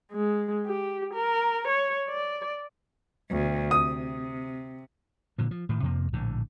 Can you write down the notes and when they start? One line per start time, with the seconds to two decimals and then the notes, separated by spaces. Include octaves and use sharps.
0.12 G#3
0.66 G4
1.14 A#4
1.68 C#5
2.08 D5
3.29 D2 B2
3.71 C3 D#6
5.38 A#2 D3 F3
5.51 F3
5.69 A2 D#3
5.82 F2 C3 F3 A#3
6.13 A#1 A2 D3